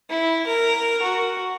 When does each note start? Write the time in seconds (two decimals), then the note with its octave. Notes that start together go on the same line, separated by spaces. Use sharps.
0.10 E4
0.47 A#4
1.02 F#4